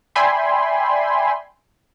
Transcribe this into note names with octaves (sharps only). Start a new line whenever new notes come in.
D5 E5 G5 G#5 B5 C6